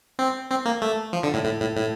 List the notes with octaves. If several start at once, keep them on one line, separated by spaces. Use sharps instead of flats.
C4
C4
A#3
A3
F3
D3
A2
A2
A2
A2